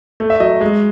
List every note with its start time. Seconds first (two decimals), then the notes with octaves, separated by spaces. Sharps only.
0.20 A3
0.30 E5
0.40 F#3 D#5
0.61 G#3